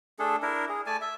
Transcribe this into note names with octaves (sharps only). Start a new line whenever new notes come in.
A3 D4 G#4 A4
D4 E4 A#4
G#4
A3 D5 G#5 A5
E5